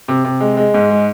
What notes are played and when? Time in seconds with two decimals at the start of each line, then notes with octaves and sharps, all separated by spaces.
0.08 C3
0.24 C3
0.40 G#3
0.57 G#3
0.74 G#2
0.90 G#3